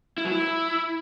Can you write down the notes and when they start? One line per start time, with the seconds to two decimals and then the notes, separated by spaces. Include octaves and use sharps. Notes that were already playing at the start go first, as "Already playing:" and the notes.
0.18 E4
0.25 F#3
0.32 E4